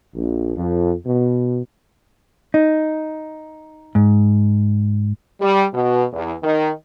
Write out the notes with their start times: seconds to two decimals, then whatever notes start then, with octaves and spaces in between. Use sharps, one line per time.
0.15 A#1
0.57 F2
1.06 B2
2.54 D#4
3.95 G#2
5.41 G3
5.73 B2
6.13 E2
6.43 D#3